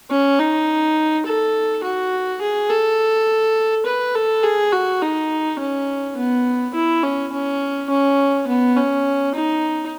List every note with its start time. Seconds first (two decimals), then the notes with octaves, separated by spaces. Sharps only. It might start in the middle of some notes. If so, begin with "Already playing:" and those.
0.11 C#4
0.40 D#4
1.26 A4
1.84 F#4
2.41 G#4
2.70 A4
3.86 B4
4.15 A4
4.44 G#4
4.73 F#4
5.02 D#4
5.59 C#4
6.17 B3
6.75 E4
7.04 C#4
7.33 C#4
7.90 C#4
8.48 B3
8.77 C#4
9.35 D#4